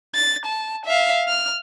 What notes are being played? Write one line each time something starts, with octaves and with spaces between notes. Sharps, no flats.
A6
A5
E5 F5
F6